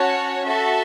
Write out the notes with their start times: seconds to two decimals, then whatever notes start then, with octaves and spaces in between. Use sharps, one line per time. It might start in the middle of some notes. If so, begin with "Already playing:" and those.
Already playing: C#4 F#4 C#5 F#5 A5
0.46 F#4 A4 E5 A5